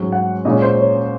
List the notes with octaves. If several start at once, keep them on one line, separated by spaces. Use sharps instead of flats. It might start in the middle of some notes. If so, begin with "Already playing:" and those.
Already playing: G#2 F#3 C#4
F#5
A#2 G#3 C#4 D#5
C5
C#5